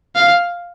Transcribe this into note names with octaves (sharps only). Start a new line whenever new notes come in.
F5